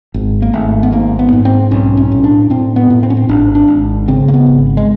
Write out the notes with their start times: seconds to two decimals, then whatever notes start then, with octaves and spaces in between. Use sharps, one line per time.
0.14 G#1
0.42 A#3
0.53 G#1 A3
0.83 B3
0.92 G#2 A#3
1.19 B3
1.33 G#2
1.45 C4
1.71 B1 C#4
1.97 C#4
2.12 A2
2.24 D4
2.50 A2 C4
2.76 B3
2.90 A2
3.03 C4
3.10 C#4
3.17 C4
3.29 G#1 D4
3.55 D4
3.68 G#1
4.08 C#3 C4
4.28 A#3
4.34 B3
4.46 G#1
4.77 G#3